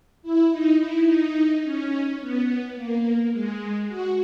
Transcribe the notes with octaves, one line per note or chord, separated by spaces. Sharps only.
E4
D#4
E4
D#4
C#4
B3
A#3
G#3
F#4